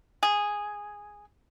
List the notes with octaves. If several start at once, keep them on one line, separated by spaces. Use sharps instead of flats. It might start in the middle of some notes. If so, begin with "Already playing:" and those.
G#4